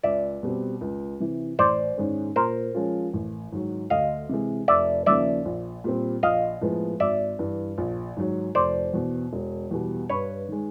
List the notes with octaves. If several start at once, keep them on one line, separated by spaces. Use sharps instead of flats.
C#2 D5 E5
B2 G3 C4
C#2
C3 E3
A1 C5 D5
G#2 D#3 G#3 C#4
A#2 A#4 C5
F3 G#3 C#4 F4
A1
G#2 D#3 F#3
D2 D#5 F5
C3 E3 G#3
F1 D5 E5
D#2 C#3 F3 A#3 D5 E5
A#1
A#2 G3 C4
A#1 D#5 F5
A2 F3 G#3 B3
G#1 D5 E5
G2 E3
A#1
G#2 D#3 F#3
F1 C5 D5
E2 B2
E1
E2 B2 G3
G2 B4 C#5
D#3 G#3